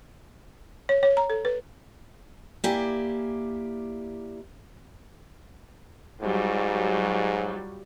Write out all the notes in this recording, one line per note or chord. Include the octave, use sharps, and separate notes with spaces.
C#5
C#5
A#5
A4
B4
A#3 E4 G4 D5 G#5
G#2 F#3 G3 F4